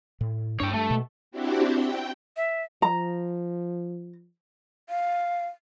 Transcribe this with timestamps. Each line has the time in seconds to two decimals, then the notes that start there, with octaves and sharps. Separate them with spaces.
0.21 A2
0.60 G2 D4 C#5 G5
0.74 G2 A3
0.91 B2
1.31 C4 D4 E4 F#4 G4
1.72 G5
2.37 E5
2.82 F3 A#5
4.89 F5